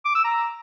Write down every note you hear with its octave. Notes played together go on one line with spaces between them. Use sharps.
D6
E6
A#5